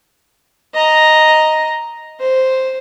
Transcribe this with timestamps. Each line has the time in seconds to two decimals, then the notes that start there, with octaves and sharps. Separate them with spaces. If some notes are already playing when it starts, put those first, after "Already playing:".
0.74 D#5 A#5
2.20 C5